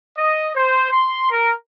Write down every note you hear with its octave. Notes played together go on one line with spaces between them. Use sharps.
D#5
C5
C6
A#4